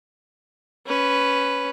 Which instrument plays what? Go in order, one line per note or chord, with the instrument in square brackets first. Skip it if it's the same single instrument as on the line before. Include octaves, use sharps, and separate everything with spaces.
[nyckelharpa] C#4 B4